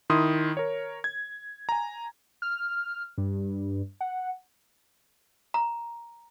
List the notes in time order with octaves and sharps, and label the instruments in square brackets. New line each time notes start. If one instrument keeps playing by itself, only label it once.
[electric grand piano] D#3 E4 C6 D#6
A#4 C#5
G#6
G#5 A#5
[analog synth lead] F6
G2
F#5
[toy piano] A#5